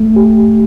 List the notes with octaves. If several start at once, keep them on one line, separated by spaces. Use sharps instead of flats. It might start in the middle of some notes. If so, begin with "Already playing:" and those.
Already playing: A3
G4